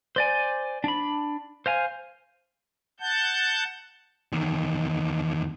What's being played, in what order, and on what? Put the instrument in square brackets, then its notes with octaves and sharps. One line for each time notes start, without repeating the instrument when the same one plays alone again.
[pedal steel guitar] C5 D5 G#5
D4 B5
C5 F5 G#5
[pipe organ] F#5 A5 G6
[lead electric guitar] E2 D#3